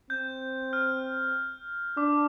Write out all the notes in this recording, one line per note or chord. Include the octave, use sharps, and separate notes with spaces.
C4 G6
F6
D4 D6